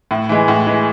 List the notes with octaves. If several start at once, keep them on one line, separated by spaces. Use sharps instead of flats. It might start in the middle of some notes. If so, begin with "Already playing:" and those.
A2
E3 G#3
A2
E3 G#3